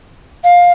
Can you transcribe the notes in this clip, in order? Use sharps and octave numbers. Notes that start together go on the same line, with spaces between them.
F5